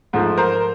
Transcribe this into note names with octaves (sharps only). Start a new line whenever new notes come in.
G#2 F3 A3
A#4 C5